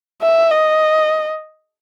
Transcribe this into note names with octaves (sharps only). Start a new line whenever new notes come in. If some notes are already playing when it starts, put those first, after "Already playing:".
E5
D#5